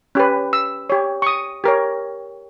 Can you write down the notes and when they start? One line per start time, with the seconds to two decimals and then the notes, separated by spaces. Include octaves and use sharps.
0.15 C#4 G4 B4
0.53 E6
0.90 G4 C#5
1.22 C#6
1.27 D#6
1.64 G4 A#4 C#5